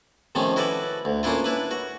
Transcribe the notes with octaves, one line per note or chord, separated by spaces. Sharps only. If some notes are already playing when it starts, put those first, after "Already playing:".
C3 D#3 F3 A3 C#4
E4 F#4 A4 B4 D5 D6
D2
A#3 C#4 D4 E4 F4
D4 E4 B4
F#4